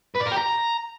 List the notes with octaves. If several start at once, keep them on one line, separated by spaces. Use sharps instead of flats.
B4
D5
A#4
G4
A#5